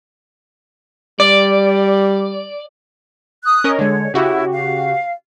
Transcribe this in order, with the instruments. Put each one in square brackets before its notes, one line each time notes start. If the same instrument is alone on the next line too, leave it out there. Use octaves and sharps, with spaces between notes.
[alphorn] G3 [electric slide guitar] D5
[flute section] D#6 F#6
[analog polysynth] C#4 A#4 D#5
[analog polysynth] D3 G#3 [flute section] C#5
[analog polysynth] C#3 F#4 G4 [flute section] E4
[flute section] F5